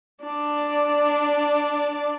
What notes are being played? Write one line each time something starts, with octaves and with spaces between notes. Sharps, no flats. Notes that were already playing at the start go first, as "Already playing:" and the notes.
D4 D5